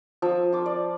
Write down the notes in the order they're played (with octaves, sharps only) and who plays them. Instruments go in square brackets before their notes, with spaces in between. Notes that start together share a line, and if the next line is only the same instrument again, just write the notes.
[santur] F3 E6
F4 D6
D5